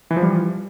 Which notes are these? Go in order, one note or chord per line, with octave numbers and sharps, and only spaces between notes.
E3
F3
G3